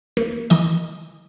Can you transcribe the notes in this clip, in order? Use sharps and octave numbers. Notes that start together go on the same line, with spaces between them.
A#3
E3 D#5